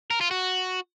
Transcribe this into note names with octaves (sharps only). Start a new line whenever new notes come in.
A#4
F4
F#4